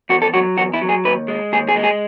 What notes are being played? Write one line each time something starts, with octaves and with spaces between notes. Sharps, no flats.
E2 F#4
A4
F#3 F#4
E2 F#4
E4
F#3
G#4
D#2 B4
G#3
D#2 G#4
G#4
G#3
G#4